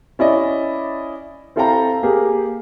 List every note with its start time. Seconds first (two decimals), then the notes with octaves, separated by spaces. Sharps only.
0.19 C#4 E4 D5 D#5
1.56 C4 E4 A4 F5 G5 A#5
2.03 A#3 G4 G#4 A#4